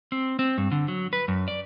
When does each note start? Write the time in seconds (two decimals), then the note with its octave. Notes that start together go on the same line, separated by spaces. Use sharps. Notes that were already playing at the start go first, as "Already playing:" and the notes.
0.12 C4
0.39 C4
0.58 G2
0.72 D3
0.88 F#3
1.13 B4
1.28 F#2
1.48 D5